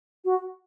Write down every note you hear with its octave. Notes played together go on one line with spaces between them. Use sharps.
F#4